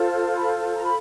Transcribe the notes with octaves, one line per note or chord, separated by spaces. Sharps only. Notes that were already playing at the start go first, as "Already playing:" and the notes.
Already playing: F4 A4 C5
B5
A#5
B5